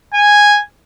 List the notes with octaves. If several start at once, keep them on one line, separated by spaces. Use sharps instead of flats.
G#5